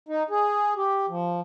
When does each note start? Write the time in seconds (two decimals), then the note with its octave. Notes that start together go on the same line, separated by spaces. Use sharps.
0.08 D#4
0.30 G#4
0.76 G4
1.09 F3